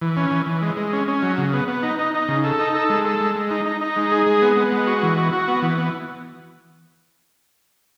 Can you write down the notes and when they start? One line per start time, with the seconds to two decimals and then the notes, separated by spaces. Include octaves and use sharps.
0.01 E3
0.17 C#4
0.31 E3
0.46 E3
0.62 G#3
0.77 G#3
0.93 C#4
1.08 C#4
1.22 F#3
1.38 C#3
1.53 B3
1.68 B3
1.83 D#4
1.99 D#4
2.14 D#4
2.29 C#3
2.44 A4
2.59 D#4
2.75 A4
2.90 G#3
3.05 A4
3.20 G#3
3.35 G#3
3.51 D#4
3.66 D#4
3.81 D#4
3.96 G#3
4.12 G#4
4.26 G#3
4.42 B3
4.57 B3
4.72 G#3
4.87 F#4
5.03 E3
5.17 F#4
5.32 F#4
5.48 B3
5.62 E3
5.78 B3